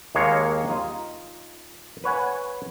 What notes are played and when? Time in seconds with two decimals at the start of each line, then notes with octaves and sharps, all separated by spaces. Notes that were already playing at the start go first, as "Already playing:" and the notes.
0.15 D#2 G#3 A#3 C#5 F5
0.68 D#4 F4
2.04 B4 C#5 F#5 G#5